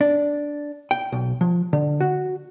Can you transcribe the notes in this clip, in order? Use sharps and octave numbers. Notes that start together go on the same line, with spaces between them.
D4
G5
B1
F3
D3
F#4